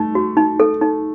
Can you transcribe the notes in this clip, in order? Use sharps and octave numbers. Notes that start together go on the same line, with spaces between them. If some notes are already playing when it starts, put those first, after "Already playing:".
Already playing: A3 D#4
F#4
D#4
A4
D#4